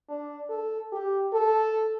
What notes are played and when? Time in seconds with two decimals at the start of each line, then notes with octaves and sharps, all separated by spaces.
0.09 D4
0.50 A4
0.92 G4
1.33 A4